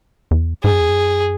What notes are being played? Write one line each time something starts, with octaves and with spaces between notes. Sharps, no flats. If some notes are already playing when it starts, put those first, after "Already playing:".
E2
G#2 G#4
F#2
E2
F#2